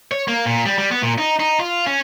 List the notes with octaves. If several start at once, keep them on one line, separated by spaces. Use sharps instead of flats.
C#5
A#3
A#2
G3
G3
B3
A#2
D#4
D#4
F4
C#4